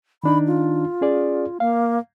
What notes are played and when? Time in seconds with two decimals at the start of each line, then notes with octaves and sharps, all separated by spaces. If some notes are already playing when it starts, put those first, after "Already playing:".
0.24 D#3 D4 D#4 B5
0.47 F4
1.01 C#4 G#4 D5
1.60 A#3 F5